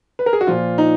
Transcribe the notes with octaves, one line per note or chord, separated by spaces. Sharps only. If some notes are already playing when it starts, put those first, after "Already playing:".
B4
A#4
G#4
F#4
A#2 F3 F4
D#4